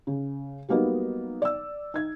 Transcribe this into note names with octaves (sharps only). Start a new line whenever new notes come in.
C#3
F#3 G3 A#3 B3 D#4
D5 E6
D#4 G#6